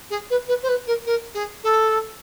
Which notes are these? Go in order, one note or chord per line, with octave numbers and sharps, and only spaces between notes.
G#4
B4
B4
C5
B4
A#4
A#4
G#4
A4